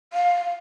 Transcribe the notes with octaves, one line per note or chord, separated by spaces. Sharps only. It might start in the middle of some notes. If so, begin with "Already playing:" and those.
F5